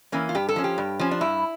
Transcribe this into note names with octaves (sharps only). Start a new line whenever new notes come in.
E3 A#3 C#4
F4
G2 G4
A4
F3 C#4
G4
G2
F3 C#4
D4
G2 E4